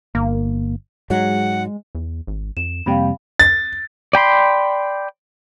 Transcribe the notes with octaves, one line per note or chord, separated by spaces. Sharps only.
G1 A#3
G#2 F#3 G#3 F#5
E2
G#1
F2 E7
F2 C3 G3 A#3 F5 G5 B5
A6
D5 G5 B5 C6